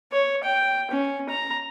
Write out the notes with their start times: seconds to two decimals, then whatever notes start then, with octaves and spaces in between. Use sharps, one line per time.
0.12 C#5
0.44 G5
0.91 C#4
1.29 A#5